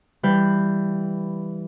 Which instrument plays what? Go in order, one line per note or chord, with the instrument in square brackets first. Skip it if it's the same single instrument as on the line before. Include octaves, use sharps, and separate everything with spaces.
[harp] E3 G3 B4 F5 G6